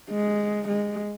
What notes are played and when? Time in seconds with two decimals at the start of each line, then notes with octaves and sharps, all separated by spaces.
0.11 G#3
0.68 G#3